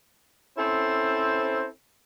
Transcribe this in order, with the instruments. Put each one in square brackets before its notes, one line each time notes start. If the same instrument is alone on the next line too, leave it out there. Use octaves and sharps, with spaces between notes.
[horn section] C4 C#4 E4 A4 C5